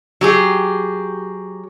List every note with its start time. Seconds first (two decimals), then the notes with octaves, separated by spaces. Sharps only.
0.21 F#3 G4 G#4